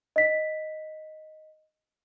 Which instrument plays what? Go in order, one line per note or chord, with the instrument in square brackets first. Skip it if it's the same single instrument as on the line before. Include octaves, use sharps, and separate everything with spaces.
[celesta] D#5 B6